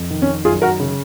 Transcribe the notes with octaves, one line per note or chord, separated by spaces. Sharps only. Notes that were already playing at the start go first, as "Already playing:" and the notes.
Already playing: F2
D#3
C#4
F#2 F4 G#4
F#4 A#4
C#3